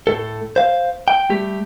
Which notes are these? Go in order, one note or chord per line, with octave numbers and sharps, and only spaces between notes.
A2 A4
C5 F5
G5
G3 A3 G4